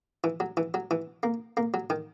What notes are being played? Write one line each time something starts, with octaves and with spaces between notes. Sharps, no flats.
E3
F#3
E3
F#3
E3
A#3
A#3
F#3
D#3